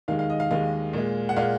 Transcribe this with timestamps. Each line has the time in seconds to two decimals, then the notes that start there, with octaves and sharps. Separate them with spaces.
0.08 D#2 D#3 G#3 F5
0.19 F5
0.30 D#5
0.40 F5
0.51 D#2 D#3 G#3 F5
0.93 A#2 G#3
1.29 F#5
1.36 A#2 G#3 F5